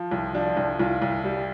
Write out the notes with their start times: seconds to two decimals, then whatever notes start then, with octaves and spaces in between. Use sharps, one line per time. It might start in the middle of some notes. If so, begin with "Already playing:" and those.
Already playing: F3
0.11 C2
0.35 F3 D4
0.57 C2
0.80 C2 F4
1.02 C2
1.25 G3